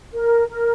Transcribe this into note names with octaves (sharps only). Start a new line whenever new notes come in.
A#4
A#4